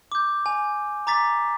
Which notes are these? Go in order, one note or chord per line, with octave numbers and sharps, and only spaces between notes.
D6 G6
G#5
A#5 D6 A6 B6